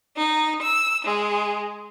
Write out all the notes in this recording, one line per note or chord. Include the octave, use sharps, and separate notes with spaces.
D#4
E6
G#3